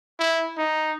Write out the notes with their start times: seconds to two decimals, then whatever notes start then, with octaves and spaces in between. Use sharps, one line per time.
0.20 E4
0.58 D#4